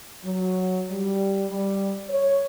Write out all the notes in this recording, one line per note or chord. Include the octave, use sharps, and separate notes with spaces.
F#3
G3
G3
C#5